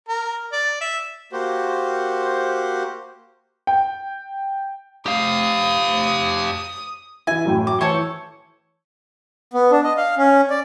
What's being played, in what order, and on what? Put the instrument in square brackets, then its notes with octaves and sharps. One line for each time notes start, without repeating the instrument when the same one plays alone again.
[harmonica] A#4
D5
E5
[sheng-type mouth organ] A#3 F#4 G4 C5
[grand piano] G5
[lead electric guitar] G4 F5 [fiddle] D#6
[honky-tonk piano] E3 E4 [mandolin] G#5
[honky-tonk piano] F#2 A2 G5
[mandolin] D6
[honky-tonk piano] E3 [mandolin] A4 C5 C#5
[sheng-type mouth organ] B3
D4
D#5
F5
C#4
D5